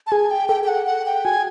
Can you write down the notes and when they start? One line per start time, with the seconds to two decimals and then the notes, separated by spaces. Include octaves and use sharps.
0.07 A5
0.12 G#4 G#5
0.31 G5
0.49 A4 G5
0.64 G5
0.68 F#5
0.86 F#5
1.06 G5
1.25 F#4 G#5